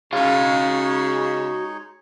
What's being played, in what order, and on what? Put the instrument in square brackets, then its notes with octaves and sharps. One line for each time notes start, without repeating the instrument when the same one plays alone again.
[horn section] C#3 [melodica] G#3 D#4 C#5 [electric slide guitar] F#4 F5